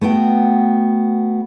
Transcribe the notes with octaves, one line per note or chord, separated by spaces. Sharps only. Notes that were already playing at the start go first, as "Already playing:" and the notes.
A3 B3 F#4 G5